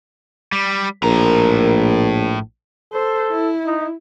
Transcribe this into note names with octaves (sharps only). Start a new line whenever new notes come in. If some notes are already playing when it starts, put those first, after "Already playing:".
G3
A#1 A2 A#4 A#5
A4 C5
E4
D#4